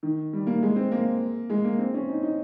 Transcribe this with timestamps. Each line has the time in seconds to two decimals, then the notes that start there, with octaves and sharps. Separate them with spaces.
0.03 D#3
0.33 G3
0.47 A#3
0.63 G#3
0.76 C4
0.91 A#3
1.50 G#3
1.64 A#3
1.79 C4
1.94 C#4
2.09 D#4
2.23 D#4